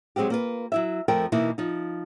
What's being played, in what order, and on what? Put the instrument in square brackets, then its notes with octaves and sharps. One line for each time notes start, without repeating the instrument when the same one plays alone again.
[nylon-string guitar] F#3 G#3 C4 F#4 G4
A#3 F4 B4
F#3 E4 E5
F2 F3 A3 A#4 G5
B2 E3 A#3 D#4 E4
F3 D#4